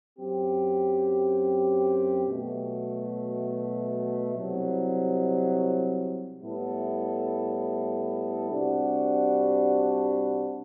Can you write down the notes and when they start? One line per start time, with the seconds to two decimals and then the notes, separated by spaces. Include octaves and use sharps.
0.18 F#2 F#3 C4 G4
2.25 B2 F#3 A3
4.33 C2 C3 F#3
6.40 A2 G3 B3 E4 A4
8.48 C3 G3 D4 F#4